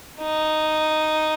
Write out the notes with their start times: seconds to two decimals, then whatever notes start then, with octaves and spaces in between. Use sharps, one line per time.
0.21 D#4